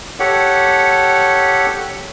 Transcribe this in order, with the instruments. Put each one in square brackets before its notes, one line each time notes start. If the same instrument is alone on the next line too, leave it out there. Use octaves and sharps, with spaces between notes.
[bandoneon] G4 A4 C#5 F#5